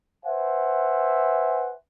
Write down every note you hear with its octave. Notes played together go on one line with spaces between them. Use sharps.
B4 C5 E5 F#5 G#5